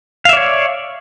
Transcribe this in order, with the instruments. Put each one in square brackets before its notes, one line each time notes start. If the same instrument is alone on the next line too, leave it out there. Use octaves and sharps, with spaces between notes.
[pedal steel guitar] F5
E5
D5
C#5